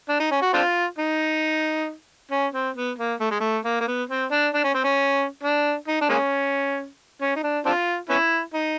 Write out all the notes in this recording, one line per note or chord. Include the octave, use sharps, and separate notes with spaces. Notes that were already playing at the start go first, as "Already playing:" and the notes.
D4
D#4
C#4
F#4
C4 D4 F4
D#4
C#4
C4
B3
A#3
A3
G#3
A3
A#3
A#3
B3
C4
D4
D4
C#4
C4
C#4
D4
D#4
D4
G#3 A#3 C#4
C#4
D#4
D4
C4 D4 F4
B3 C#4 E4
D#4